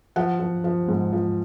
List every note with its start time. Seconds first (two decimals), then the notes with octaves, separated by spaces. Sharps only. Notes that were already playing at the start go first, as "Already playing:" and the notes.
0.16 F3 F#5
0.40 F3
0.64 F3
0.88 G#2
1.12 F3